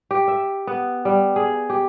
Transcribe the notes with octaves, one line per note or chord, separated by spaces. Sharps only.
G4
E5
B3
G3
G#4
G4